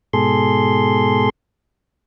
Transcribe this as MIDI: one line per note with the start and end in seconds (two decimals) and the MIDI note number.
0.13 1.30 44
0.13 1.30 47
0.13 1.30 68
0.13 1.30 69
0.13 1.30 84